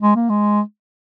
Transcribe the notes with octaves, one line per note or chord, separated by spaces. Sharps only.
G#3
A#3
G#3